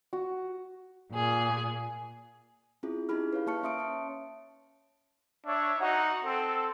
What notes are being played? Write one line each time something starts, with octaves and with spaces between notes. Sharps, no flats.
F#4
A#2 G#4
C4 C#4 E4 F4 G#4
D#4 E4 G4 G#4 B5 F6
B4 C#5 F5
A#3 C#5 A5 C#6 F6 C#7
C#4 E5 C6 D#6 C#7 D7
C#5 A5
D4 C#5 E5
D#4 F#4 F#5
C4 A4